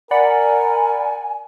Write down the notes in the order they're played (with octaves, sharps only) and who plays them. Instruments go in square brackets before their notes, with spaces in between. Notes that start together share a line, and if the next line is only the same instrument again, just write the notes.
[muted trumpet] A#4 [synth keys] D5 F#5 B5 [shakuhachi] G#5